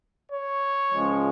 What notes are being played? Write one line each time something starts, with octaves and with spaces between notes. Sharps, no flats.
C#5
C#2 C#3 F3 G#3